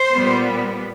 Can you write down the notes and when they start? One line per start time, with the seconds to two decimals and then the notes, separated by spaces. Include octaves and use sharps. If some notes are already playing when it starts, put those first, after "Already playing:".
Already playing: C5
0.13 A#2 G3 B3